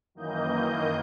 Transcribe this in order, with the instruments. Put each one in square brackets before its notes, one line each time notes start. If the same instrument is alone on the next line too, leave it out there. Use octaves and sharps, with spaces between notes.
[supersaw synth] F#2 D#3 E3 A#3 D#5 G6